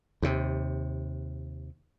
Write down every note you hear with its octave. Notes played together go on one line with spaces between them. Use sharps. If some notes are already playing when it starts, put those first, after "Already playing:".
D#2 C3